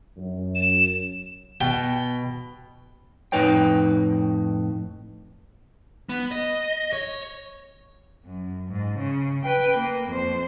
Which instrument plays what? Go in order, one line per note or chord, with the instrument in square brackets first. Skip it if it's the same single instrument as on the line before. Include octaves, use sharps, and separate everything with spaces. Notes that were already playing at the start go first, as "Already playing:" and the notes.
[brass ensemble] F#2
[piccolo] E7
[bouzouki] B2 [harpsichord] G5
[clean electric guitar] F2 A2 D#4 B4 C#5 G5
[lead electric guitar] B3
D#5
C#5
[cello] F#2
G#2
C#3
B4 G5
A#3
F2 C5